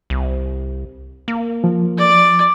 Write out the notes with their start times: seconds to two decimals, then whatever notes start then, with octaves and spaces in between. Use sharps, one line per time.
0.10 C2
1.28 A#3
1.64 F3
1.98 D5